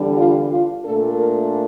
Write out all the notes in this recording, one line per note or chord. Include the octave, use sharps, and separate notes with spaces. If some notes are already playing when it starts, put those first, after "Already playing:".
Already playing: E2 D3 G3 D4
F4
F4
A#2 A3 D4 A4
A#4